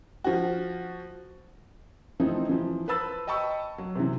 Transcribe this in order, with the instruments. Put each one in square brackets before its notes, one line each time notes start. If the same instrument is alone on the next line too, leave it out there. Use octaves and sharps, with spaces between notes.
[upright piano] F3 F#4
[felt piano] E3 F3 A3 C4 D#4 A4
E3 F3
B4 C5 A5 B5 E6 A6
D#5 G5 A5 B5 C#6 E6
F#3
C3 E3